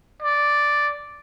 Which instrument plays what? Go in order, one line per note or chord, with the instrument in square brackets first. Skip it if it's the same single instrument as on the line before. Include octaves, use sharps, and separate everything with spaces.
[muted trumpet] D5